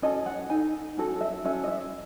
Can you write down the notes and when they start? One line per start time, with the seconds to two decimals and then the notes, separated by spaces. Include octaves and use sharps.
0.02 C#4 F#4 A4 D#5
0.26 F#5
0.50 D#4 A4 G#5
0.97 C#4 F#4 A4
1.21 E5
1.44 C#4 F#4 A4 E5
1.64 D#5
1.68 E5